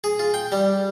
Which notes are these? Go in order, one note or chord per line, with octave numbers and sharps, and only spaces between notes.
G#4
F4
G5
G3